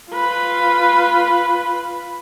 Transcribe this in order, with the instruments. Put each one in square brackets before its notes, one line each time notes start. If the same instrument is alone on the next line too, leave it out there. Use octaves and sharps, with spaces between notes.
[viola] F4 B4